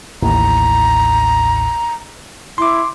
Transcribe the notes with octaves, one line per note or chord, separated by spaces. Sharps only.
A1 D#2 A2 A#5
E4 C6 D6